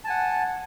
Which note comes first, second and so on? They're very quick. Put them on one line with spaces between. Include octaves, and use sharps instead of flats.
A5 G#5 F#5